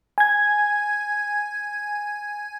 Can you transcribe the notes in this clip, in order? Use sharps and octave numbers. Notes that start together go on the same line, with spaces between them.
G#5 G#6